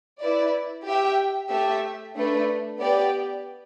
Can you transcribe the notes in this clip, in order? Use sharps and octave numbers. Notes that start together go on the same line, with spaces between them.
E4 B4 D5
G4 E5 G5
A3 G4 E5
A3 D4 B4
B3 G4 B4 D5